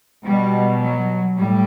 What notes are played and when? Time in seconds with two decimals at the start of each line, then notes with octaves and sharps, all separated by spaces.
0.25 B2 G3
0.81 F#3
1.36 A2 G3